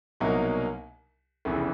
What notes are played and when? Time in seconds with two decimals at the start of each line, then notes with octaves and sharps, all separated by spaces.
0.20 C2 B2 F#3 A#3 D#4
1.45 F1 E2 C#3 E3